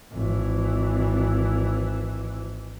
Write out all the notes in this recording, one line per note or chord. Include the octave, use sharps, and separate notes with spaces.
G#1 E3